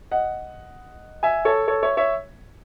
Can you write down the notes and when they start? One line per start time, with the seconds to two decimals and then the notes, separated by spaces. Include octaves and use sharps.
0.11 D#5 F#5
1.23 E5 G#5
1.45 A4 C#5
1.68 A4 C#5
1.82 C#5 E5
1.97 C#5 E5